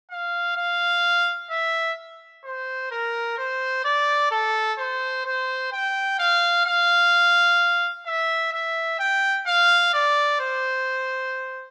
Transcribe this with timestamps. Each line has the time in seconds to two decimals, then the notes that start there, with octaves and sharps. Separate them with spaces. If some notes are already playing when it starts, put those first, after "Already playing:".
0.11 F5
0.57 F5
1.51 E5
2.44 C5
2.91 A#4
3.38 C5
3.84 D5
4.31 A4
4.79 C5
5.25 C5
5.72 G5
6.19 F5
6.66 F5
8.06 E5
8.53 E5
8.99 G5
9.47 F5
9.93 D5
10.40 C5